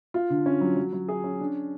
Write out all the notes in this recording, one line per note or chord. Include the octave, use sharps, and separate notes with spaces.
F4
D3
C#4
F#3
F#3
F#3
G#4
C#4
D4